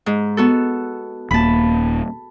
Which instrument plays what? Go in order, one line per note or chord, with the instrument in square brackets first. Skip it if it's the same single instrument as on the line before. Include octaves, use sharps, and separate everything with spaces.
[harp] G#2
B3 F#4 A4
[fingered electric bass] D#1 A#3 [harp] A5 B5